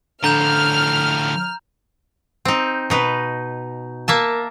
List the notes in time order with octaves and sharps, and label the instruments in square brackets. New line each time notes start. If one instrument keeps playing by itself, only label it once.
[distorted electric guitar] A2 F3 [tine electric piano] D3 [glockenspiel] A#5 G6 E7 [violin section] F6
[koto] C4 D#4
B2 D#4 B4
A#3 E5 A5